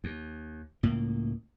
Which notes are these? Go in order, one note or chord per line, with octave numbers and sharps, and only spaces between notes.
D#2
C#2 A2 A#3